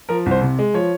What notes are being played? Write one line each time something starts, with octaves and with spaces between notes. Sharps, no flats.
F3 A#4
C2
C5
C3
G#3
F3 C#5